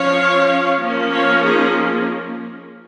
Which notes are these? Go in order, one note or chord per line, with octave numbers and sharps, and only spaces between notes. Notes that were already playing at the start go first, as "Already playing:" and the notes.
Already playing: F3 C#4 C#5 F5
F3 A#3 C#4
C#5 F5
D#4 G#4